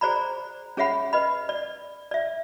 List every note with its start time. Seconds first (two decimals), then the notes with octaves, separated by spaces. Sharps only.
0.01 G#4 C5 D5 A#5 B5
0.77 C#4 G#4 C#5 E5 F#5 B5
1.13 B4 D#5 B5
1.49 D5
2.11 D5 E5